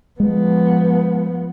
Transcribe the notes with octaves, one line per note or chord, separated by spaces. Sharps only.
F3 G#3 B3